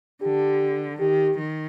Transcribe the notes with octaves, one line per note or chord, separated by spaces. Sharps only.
D3 G4
D#3 G4
D#3